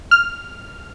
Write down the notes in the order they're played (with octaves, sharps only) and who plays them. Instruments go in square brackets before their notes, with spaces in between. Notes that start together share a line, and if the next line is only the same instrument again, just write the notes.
[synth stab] F6